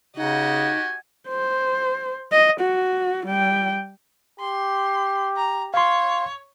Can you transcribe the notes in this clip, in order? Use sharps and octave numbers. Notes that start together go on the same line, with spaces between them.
C#3 D#4 F#4 G4 D#5 F#5 G#5
C5
D#5
F#4
G3 G5
G4 C6
A#5
C#5 F5 C6